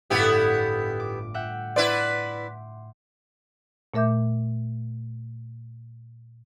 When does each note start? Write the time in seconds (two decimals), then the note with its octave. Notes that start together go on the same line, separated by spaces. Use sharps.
0.10 G1 A2 B3 E4 F4 G4
1.00 D6
1.34 E5 F#5 G5
1.76 E4 B4 D5 C6 D6
3.94 A#2 A3 A#4 E5 D6 G6